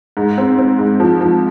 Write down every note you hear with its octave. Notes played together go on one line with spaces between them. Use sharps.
G#2
C4
C4
G#2
F3
F3